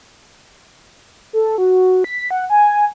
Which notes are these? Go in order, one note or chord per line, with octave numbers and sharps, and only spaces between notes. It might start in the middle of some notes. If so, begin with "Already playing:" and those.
A4
F#4
B6
F#5
G#5